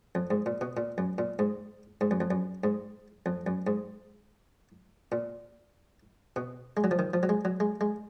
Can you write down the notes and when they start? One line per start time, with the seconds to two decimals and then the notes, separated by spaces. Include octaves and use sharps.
0.15 F2
0.31 G#2
0.46 A#2
0.61 B2
0.77 A#2
0.98 F#2
1.18 A#2
1.39 G#2
2.01 G#2
2.11 F#2
2.20 F2
2.31 F#2
2.64 G#2
3.26 F2
3.47 F#2
3.67 G#2
5.12 A#2
6.36 B2
6.77 G#3
6.84 F#3
6.91 F3
6.99 D#3
7.13 F3
7.23 F#3
7.29 G#3
7.45 F#3
7.60 G#3
7.81 G#3